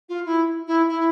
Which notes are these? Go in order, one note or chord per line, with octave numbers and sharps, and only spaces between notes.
F4
E4
E4
E4